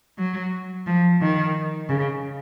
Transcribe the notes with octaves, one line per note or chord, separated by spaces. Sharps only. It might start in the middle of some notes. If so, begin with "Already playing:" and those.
F#3
F3
D#3
C#3